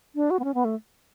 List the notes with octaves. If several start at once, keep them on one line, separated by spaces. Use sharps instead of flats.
D4
F#4
B3
C#4
B3
A3